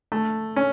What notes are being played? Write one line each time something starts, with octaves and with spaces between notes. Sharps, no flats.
A3
C#4